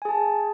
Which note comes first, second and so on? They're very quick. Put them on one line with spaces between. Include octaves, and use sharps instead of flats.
G#5 G#4 A5